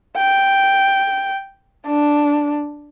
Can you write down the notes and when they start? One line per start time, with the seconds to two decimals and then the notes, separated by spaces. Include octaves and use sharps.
0.17 G5
1.87 D4